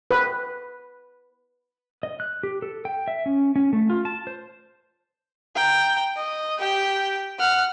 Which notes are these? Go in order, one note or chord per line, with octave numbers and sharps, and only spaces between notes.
B4
D#5
F#6
G4
A4
G5
E5
C#4
C#4
A3
F4
A5
C5
G5 A#5
D#5
G4 G5
F#5 F6